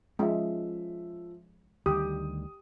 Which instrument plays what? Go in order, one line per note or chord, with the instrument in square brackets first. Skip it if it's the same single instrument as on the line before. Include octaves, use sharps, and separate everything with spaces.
[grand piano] F3 E5 [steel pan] G#3 [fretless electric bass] C#4
[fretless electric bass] D2 D#3 G3 [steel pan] G4 [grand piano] D#6